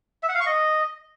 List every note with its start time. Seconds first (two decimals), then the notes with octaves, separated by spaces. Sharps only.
0.23 E5
0.29 F#5
0.35 F5
0.40 C#6
0.46 D#5